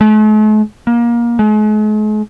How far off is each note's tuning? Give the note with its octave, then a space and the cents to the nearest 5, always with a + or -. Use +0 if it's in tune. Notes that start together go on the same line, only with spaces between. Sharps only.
A3 -45
A#3 +25
G#3 +45